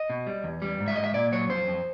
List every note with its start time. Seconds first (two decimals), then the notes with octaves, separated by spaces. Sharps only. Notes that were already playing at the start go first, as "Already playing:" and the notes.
Already playing: D#5
0.10 B2
0.27 G3
0.44 E2
0.62 G3
0.80 G#2
0.88 E5
0.96 G#2 D#5
1.04 E5
1.14 A#2 D5
1.32 F#3 C#5
1.49 F2 C5
1.67 F2